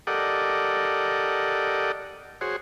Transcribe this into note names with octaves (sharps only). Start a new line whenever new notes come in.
G4 A4 A#4 D5 D#5 F#5
F#4 G#4 C5 C#5